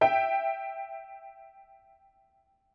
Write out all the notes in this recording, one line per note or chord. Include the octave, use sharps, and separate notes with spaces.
E5 G5